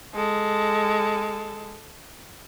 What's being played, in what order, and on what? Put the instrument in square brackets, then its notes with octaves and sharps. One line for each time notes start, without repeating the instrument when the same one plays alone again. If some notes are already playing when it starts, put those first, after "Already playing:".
[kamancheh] G#3 A4